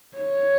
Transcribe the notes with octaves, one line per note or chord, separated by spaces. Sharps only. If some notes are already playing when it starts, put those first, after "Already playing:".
C#5